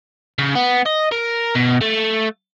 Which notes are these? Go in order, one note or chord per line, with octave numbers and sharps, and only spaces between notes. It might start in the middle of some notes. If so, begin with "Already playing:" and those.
C#3
B3
D#5
A#4
B2
A3